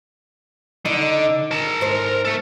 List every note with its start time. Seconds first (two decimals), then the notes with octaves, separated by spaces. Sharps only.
0.85 D3 D#4
1.51 A#4 A5
1.81 G#2 C5
2.25 A3 A4